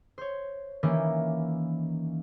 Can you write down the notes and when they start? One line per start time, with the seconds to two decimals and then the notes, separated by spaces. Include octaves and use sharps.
0.18 C5 C#5
0.83 D#3 E3 A#3 C#4 G4